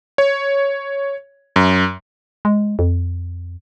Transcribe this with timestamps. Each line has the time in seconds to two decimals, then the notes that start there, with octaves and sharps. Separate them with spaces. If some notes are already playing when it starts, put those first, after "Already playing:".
0.18 C#5
1.56 F#2
2.45 G#3
2.79 F2